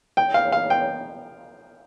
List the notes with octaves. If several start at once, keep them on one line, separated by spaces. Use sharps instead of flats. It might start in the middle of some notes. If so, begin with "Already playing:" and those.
G5
F5
F5
G5